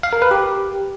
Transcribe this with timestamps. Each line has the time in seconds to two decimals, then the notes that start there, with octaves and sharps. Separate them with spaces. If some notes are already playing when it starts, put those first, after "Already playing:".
0.03 F5
0.13 A#4
0.22 B4
0.31 G4